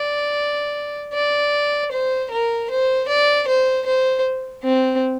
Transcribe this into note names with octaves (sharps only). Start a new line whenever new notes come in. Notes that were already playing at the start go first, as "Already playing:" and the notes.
Already playing: D5
D5
C5
A#4
C5
D5
C5
C5
C4